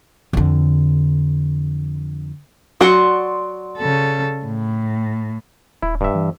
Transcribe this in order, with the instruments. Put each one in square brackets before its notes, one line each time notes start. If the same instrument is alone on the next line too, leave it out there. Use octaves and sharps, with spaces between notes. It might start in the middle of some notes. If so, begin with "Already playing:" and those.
[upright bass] F2 D3
[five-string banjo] F#3 F#4 [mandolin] D5 C6 C#6
[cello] C#3 A4
A2
[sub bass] D#1 [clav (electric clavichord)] E4
[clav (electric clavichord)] G2 E5
[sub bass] E3